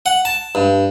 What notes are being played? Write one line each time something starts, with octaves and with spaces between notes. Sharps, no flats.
F#5
A5
G2